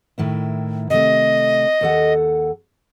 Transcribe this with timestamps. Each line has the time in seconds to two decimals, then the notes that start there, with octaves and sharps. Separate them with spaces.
0.18 A2 D#3 E4
0.90 C3 A3 D#5
1.81 D#2 A4 F#5